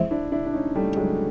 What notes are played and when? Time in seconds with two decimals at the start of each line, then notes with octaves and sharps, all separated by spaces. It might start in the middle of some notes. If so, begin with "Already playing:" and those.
Already playing: G#2 E3 C4
0.11 D4 E4
0.32 D4 E4
0.46 D4
0.53 C#4 D#4
0.75 G3 A3
0.96 F#3 G#3